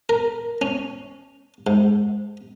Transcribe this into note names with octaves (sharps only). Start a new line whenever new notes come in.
A#4
C#4
G#2